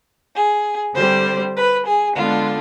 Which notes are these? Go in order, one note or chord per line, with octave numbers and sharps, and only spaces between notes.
G#4
D3 G3 C4 C5
B4
G#4
D3 G#3 B3 D4 F4